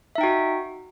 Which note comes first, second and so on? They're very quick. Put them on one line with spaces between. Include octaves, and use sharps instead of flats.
E5 D#4 G5 F#4